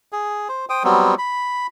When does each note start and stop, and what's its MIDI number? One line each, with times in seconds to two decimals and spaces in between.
0.12 0.48 68
0.49 0.66 72
0.70 0.83 72
0.70 0.83 79
0.70 0.83 87
0.84 1.15 54
0.84 1.15 55
0.84 1.15 59
0.84 1.15 60
1.18 1.67 83